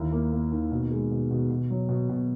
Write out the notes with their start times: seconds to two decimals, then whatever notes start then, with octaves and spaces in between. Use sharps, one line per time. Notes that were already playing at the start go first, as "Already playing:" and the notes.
Already playing: D#2 E4
0.12 A#3
0.32 A#3
0.52 D#3
0.72 B2
0.91 G#3
1.11 B2
1.31 B2
1.50 B2
1.70 F#3
1.89 B2
2.09 B2